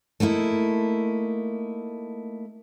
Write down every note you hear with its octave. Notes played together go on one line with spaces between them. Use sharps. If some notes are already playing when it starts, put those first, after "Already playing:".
A3 A#3 D#4 E4